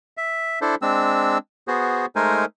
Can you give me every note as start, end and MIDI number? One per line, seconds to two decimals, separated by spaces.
0.17 0.59 76
0.62 0.75 62
0.62 0.75 64
0.62 0.75 69
0.62 0.75 72
0.82 1.38 56
0.82 1.38 60
0.82 1.38 62
0.82 1.38 88
1.68 2.06 59
1.68 2.06 66
1.68 2.06 68
1.68 2.06 72
2.16 2.45 56
2.16 2.45 57
2.16 2.45 63
2.16 2.45 70
2.16 2.45 72
2.16 2.45 80